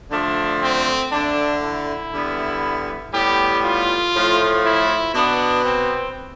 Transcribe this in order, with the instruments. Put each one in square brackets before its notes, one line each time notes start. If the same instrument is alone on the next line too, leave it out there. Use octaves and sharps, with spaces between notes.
[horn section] D3 F3 A3 D4
C4
D3 A3 D4
E4
D3 G3 B3
A2 G3 B3 G4
F4
A2 F3 A3
E4
B2 B3 D4
C4